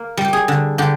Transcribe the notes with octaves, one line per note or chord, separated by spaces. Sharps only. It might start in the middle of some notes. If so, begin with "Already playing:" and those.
Already playing: A#3
G3
G4
G#4
D3
D3 G4